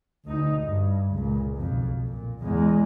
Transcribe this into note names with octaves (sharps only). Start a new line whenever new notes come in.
D2 D#4
G2
C#2 A#2
B1 F2
A#2
E2 G#3